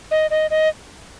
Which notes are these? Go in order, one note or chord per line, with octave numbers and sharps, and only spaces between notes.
D#5
D#5
D#5